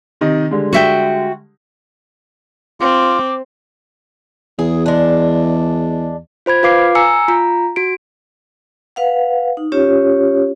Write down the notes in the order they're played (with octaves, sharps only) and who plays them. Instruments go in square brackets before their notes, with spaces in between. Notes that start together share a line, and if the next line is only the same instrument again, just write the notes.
[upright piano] C3 D#3 D#5
D3 G3 G#3
[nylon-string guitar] F#4 E5 G5
[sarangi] C4 [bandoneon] F4 [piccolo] D6
[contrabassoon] E2 [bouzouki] G#4
[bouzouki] G#3 D4
[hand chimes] F4 C5 B5 G#6
F4 B4 F5 D6 C7
G#5 A#5 E6 C#7
F4 A#5
F#4 D7
[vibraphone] B4 F5 F#5
D#4
C#4 F4 G4 C#5